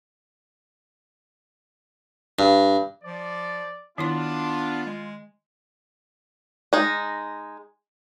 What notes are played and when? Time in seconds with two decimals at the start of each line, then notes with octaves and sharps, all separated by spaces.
2.39 G2
3.03 F3 D5
3.98 D#3 B3 D4 E4 F4 C6
4.86 G#3
6.73 G#3 D#4